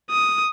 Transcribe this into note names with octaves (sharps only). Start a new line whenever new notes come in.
D#6